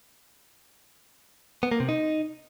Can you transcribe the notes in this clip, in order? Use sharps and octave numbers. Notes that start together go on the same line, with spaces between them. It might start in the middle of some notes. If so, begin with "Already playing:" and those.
B3
A#3
C3
D#4